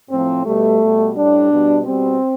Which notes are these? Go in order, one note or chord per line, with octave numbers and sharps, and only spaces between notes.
A2 F3 C4
B2 G3 A3
B2 G3
A2 G3 D4
B2 G3
B2 G3 C4